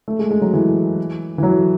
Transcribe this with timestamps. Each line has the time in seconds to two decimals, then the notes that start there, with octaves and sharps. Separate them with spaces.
0.08 A3
0.19 G#3
0.31 G#3
0.41 F#3
0.53 E3
1.38 E3
1.43 F#3